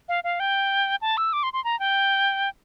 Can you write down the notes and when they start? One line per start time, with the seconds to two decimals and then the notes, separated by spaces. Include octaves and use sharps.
0.09 F5
0.24 F5
0.40 G5
1.01 A5
1.17 E6
1.33 D6
1.43 C6
1.53 C6
1.64 A#5
1.80 G5